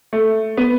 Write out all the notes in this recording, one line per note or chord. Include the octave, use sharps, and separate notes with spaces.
A3
B3